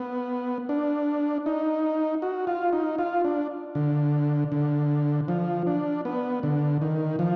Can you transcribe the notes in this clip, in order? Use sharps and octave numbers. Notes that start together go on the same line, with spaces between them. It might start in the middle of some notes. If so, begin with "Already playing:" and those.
Already playing: B3
D4
D#4
F#4
F4
D#4
F4
D4
D3
D3
F3
D4
B3
D3
D#3
F3